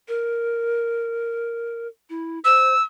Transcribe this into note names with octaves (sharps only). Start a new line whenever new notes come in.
A#4
E4
C5 E6